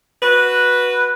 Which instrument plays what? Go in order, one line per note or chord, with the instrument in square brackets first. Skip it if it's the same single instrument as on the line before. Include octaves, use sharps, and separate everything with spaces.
[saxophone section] F#4 B4